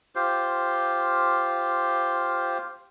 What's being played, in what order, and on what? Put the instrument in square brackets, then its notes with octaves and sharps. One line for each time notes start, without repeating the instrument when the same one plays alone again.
[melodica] F4 G4 C5